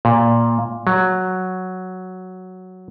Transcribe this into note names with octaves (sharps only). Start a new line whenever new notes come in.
A#2
F#3